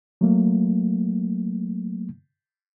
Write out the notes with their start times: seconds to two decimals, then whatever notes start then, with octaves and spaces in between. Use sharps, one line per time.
0.21 F#3 A3 A#3